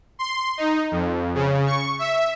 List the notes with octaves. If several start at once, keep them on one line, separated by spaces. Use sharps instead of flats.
C6
D#4
F2
C#3
C#6
E5